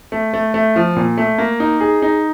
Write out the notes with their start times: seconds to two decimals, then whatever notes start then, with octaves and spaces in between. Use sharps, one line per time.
0.12 A3
0.34 A3
0.54 A3
0.76 F3
0.96 A#2
1.18 A3
1.38 A#3
1.60 D#4
1.80 G#4
2.02 D#4